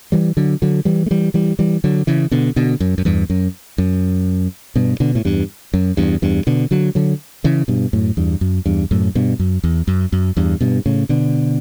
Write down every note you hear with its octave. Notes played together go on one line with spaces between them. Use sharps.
E3 G3
D3 F#3
D3 F#3
E3 G3
A3
E3 G3
E3 G3
E3 G3
D3 F#3
C#3 E3
B2 D3
B2 D3
F#2
F#2
E2 G2
F#2
F#2
G2 B2
B2 D3
A2
E2 G2
F#2
E2 G2
E2 G2
B2 D3
D3 F#3
D3 F#3
C#3 E3
G2 B2
F#2 A2
E2 G2
F#2
E2 G2
F#2 A2
G2 B2
F#2
E2
F#2
F#2
E2 G2
G2 B2
A2 C#3
B2 D3